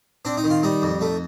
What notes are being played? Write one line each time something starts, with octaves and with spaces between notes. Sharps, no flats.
C4 D4
D#4
D#3
F4
G3 D#4
F2
A3